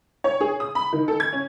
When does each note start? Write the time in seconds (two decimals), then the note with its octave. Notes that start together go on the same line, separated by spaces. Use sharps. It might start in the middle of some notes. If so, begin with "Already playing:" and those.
0.24 C#5
0.41 G#4
0.60 D#6
0.75 B5
0.93 D#3
1.08 A4
1.20 G#6
1.33 C#4